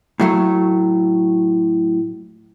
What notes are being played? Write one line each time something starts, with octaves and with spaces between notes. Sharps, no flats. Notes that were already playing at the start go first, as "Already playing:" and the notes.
A2 F#3 A3